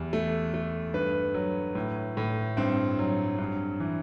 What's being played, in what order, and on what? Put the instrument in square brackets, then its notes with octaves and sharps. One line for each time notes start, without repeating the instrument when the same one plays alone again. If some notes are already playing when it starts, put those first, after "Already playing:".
Already playing: [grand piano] E2 G3
A3
A3
G2 B4
F#3
A2
A2
G2 C4
F#3
G2
E3